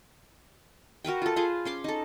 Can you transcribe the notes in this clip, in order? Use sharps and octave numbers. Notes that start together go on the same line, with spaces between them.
F#4 A#4 B4 G5
F4 A4
F4 G#4 B4 C5
C#4 C6 D6
D#4 A4